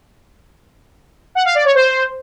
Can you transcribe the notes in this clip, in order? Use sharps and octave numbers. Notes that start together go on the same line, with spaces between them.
F#5
F5
D5
C#5
C5